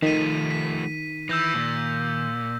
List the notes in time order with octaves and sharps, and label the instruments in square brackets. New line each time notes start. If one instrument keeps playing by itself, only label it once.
[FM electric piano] D#3 [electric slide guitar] F3 A3 [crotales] B6 D#7
[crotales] B6
[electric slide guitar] E3 [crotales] E6 G6 A#6
[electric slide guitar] A#2